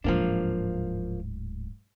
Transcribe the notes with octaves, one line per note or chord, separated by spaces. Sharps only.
D1 G#2 F3 A#3 D4